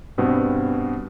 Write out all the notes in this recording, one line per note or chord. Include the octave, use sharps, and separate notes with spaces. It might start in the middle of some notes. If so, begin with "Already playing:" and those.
G2 B2 B3 C4